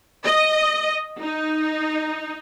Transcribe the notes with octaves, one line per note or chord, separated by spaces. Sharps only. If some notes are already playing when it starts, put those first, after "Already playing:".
D#5
D#4